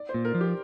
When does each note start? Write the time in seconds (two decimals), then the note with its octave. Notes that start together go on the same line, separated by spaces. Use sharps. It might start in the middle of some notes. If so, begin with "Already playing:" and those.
Already playing: D5
0.09 C5
0.14 A#2
0.25 A#4
0.35 F3
0.41 G4